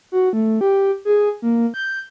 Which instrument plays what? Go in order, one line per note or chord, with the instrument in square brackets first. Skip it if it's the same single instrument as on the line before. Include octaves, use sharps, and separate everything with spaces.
[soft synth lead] F#4
A3
G4
G#4
A#3
G6